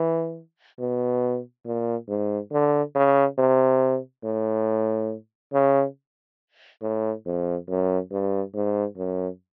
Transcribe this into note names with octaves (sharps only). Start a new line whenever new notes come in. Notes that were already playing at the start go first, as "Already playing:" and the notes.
Already playing: E3
B2
A#2
G#2
D3
C#3
C3
A2
C#3
A2
F2
F#2
G2
G#2
F#2